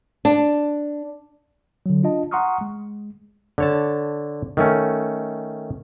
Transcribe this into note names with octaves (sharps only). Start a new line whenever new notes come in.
D4
D3 F#3
D4 F4 D#5 A5
F#5 A#5 C6 C#6 D#6 F6
G#3
D3 C#5 A5
D#3 A3 C#4